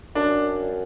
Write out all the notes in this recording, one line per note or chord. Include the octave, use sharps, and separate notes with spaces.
F#2 D4